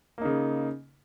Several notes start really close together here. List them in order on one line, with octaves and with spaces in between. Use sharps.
A#3 D#4 C#3